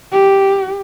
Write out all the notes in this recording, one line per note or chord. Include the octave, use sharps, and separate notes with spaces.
G4